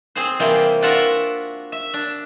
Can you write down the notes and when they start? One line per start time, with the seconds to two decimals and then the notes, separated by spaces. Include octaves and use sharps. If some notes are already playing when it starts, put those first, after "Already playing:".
0.15 C4 G#4 C5
0.40 C3 E3 G3 A#3 F4 G5
0.82 D4 F4 F#4 A#4 E5 F#5
1.72 E5
1.94 D4